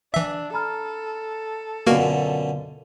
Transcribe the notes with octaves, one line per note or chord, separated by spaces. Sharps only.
E3 D4 E5 E6
A4 A#5 B5 F6
F#2 B2 D3 A#3 F4 F#4 A#4 F5